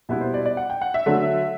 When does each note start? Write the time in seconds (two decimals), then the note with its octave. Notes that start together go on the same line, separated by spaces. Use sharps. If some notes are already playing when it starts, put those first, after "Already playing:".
0.09 B2 G3 B3 E4 E5
0.21 C5
0.34 D5
0.46 D5
0.57 F#5
0.70 G5
0.82 F#5
0.94 E5
1.06 D3 F#3 A3